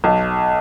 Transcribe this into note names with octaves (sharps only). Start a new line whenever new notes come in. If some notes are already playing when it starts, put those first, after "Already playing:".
B1